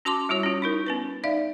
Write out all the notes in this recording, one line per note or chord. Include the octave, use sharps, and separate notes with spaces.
C#4 F#4 A5 C6 D6
G3 E4 F#4 C#5
C#4 F4
D#4 E4 A#4
B3 C#4 B4
D#4 D5 E5 F5